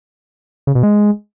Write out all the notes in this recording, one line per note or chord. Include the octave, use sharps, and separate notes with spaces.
C#3
B2
G#3